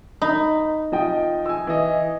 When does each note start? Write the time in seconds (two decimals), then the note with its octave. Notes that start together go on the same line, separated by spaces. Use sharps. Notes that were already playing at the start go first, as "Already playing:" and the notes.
0.22 D#4 B5
0.92 F3 D#5 G5
1.46 G#5 E6
1.67 E3 D#5